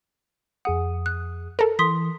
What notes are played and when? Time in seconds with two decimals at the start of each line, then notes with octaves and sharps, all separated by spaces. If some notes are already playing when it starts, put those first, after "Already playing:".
0.65 F2 G#4 F#5 D#6
1.06 F#6
1.59 A4 A#4
1.79 E3 C6 D#6 B6